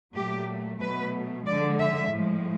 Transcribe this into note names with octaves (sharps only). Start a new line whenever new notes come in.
A#2 F#3 A3 G4
B2 F#3 A3 B4
D3 F3 G#3 D5
E5
A2 F3 G#3